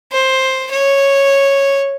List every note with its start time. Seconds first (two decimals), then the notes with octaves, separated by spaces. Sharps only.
0.12 C5
0.72 C#5